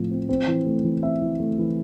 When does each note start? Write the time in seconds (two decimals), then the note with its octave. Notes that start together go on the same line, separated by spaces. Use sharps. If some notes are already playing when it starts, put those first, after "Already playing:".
Already playing: A2 F3 A3 C4
0.11 C4
0.29 C4
0.47 E3
0.66 A3
0.84 E3
1.02 C4 E5
1.22 E3
1.40 A3
1.59 E3